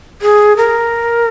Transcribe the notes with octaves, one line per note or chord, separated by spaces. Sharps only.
G#4
A#4